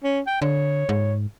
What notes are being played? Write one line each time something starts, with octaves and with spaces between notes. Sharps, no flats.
C#4
G5
D3 C#5
G#2